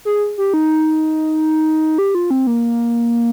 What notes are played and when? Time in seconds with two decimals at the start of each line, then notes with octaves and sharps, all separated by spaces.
0.05 G#4
0.38 G4
0.54 D#4
1.98 G4
2.15 F4
2.30 C4
2.47 A#3